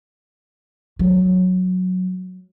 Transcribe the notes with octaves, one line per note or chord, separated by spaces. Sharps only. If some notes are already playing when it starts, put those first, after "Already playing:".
F#3